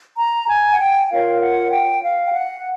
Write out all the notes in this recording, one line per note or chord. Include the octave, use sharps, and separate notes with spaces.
A#5
G#5
F#5
G5
F4 A#4 C#5 F5
F#5
G5
F5
G5
F#5